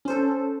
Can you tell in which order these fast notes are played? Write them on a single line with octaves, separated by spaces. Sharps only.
C#4 C5 A4